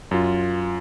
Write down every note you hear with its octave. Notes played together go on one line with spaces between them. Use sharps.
F#2 F4